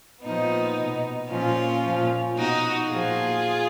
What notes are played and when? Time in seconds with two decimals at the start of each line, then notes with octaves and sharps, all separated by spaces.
0.24 A#2 F3 B3 D#4
0.78 B2
1.31 A#2 F3 C#4 F4
1.84 A#2 F3
2.38 B2 D#4 F#4
2.90 A#2 F3 F4 G#4